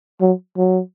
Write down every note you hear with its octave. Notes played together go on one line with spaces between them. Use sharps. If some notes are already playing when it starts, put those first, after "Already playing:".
F#3
F#3